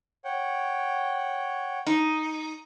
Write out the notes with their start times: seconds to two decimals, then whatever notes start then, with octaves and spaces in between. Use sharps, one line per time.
0.24 C#5 F#5 G5
1.87 D#4